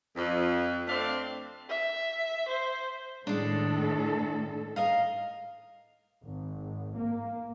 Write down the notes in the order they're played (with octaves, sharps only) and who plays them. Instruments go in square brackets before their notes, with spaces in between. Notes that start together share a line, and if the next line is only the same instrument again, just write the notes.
[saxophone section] F2
A3 C4 D4 F5
[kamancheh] E5
C5
[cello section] A2 D#3 A4 [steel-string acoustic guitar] G#3 D4
[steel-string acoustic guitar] A#4 D#5 F5
[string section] G#1
A#3